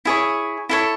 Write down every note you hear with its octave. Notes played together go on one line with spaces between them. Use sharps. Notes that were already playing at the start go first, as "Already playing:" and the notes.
E4 G#4 C#5
E4 A4 C#5